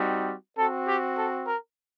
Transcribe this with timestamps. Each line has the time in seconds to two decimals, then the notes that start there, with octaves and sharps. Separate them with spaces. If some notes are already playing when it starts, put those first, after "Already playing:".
Already playing: G3 C4 D#4 F#4
0.58 C4 F#4 A4
0.88 G4
1.17 A4
1.47 A#4